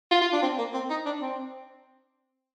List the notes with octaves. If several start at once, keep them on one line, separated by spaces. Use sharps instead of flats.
F4
F4
D4
C4
A#3
C4
D#4
D4
C4